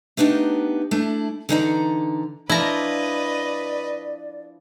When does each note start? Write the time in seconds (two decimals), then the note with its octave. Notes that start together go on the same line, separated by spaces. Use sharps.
0.17 A3 B3 D4 D#4 G4
0.91 A3 D4 E4
1.49 D3 E3 D#4 D5 F5 A#5
2.50 F3 D4 E4 B4 D5 D#5 A#5